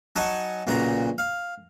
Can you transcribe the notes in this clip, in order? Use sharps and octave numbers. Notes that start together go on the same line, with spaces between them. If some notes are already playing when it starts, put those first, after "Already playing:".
F#3 D#4 F#5 G#5 A5 C#6
B1 A#2 C#3 F#4 A#5
F5